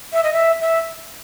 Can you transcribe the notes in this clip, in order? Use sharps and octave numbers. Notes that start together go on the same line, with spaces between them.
E5
D#5
E5
E5